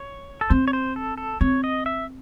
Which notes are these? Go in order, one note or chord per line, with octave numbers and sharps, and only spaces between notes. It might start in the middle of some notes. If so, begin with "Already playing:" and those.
Already playing: C#5
A4
C4 C5
C#5
C5
A4
A4
C4 C#5
D#5
E5